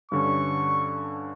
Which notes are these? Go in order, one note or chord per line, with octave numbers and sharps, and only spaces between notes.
G2 D3 C#4 C#6